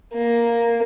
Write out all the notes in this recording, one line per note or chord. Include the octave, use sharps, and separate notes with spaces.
A#3